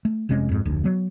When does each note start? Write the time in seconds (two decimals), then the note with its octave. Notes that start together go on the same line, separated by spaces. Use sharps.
0.05 A3
0.29 F1 C3 G#3 C#4
0.49 F2 G#2
0.65 F1 D2
0.84 F#3 B3